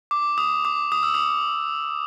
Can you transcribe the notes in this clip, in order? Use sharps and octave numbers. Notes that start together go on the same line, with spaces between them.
D6
D#6
D6
D#6
E6
D#6